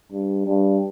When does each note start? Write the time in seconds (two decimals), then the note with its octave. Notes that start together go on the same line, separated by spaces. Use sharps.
0.12 G2
0.47 G2